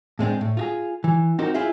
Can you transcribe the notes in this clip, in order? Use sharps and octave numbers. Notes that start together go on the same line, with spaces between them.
A2 G#3 C4 D4
A2
F4 F#4 G#4
E3
C4 D#4 F#4 G4 A#4 C5
E4 F4 G#4 C5 E5 F5